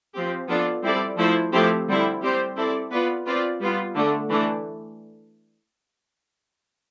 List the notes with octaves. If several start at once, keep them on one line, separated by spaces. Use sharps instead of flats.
F3 C4 G4
F3 B3 D4 F4 A4
G3 C4 E4 A4 D5
F3 A3 E4 A4 C5
F3 A3 C4 E4 G4
D3 G3 C4 E4
G3 C4 G4 C5
C4 E4 A4 D5
B3 F4 B4 D5
C4 F4 B4 D5
G3 B3 F4
D3 A3 D4
E3 A3 D4